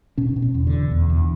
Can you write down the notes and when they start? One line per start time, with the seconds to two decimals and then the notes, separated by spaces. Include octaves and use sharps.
0.18 B2 C#4
0.36 B2
0.42 C#4
0.54 E2
0.67 D3
0.73 B2
0.91 E2
1.10 E2